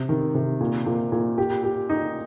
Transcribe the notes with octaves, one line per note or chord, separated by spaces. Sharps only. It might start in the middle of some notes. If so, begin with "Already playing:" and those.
Already playing: C3
D#3
C3
A#2
A#2
A#2
G4
G4
D#4